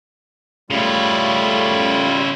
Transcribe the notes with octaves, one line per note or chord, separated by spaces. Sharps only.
C#3 G3 A3 E4 F4